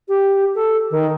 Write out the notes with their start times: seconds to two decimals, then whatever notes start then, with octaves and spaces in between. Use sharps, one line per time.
0.08 G4
0.55 A4
0.91 D#3